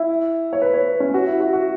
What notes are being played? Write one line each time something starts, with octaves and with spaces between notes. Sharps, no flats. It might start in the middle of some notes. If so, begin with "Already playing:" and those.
Already playing: E4
C#5
B4
C#5
B4
C#4
F#4
E4
F#4
F#4